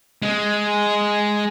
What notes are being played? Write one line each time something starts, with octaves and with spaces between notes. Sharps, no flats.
G#3